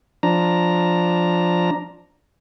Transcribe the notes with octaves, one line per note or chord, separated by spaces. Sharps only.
F3 D4 A#5